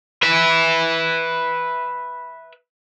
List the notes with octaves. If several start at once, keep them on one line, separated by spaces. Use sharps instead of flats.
B4 E5